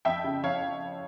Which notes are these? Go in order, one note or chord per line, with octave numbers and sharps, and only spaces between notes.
F2 E5 G5
C#3
F2 C#5 F5